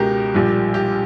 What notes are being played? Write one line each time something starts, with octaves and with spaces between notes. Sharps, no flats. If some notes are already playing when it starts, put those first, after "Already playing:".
Already playing: C#2 B2 G#3 G4 A#4
A#1 A#2 G3
G4